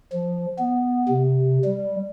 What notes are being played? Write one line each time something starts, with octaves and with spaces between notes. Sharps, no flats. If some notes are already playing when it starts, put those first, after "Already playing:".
F3
B3
C3
G3